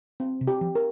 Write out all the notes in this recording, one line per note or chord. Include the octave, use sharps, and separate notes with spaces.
C4
C3
G4
F3
A#4